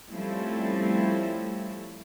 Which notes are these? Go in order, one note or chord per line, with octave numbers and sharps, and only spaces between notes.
F3 G3 A3 C4 C#4 E4